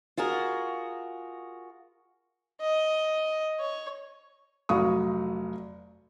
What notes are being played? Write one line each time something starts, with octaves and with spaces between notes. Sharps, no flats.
F4 F#4 G#4 A#4
D#5
C#5
F1 F#3 F5 C#6 D#6